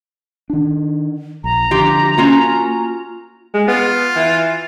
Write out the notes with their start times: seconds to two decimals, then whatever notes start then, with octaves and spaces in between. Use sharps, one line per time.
0.50 D#3 D4
1.44 A#1 A#5
1.71 D3 F3 F4 G4
2.18 A#3 C#4 F4 F#4
3.54 G#3
3.68 B3 F4
4.15 E3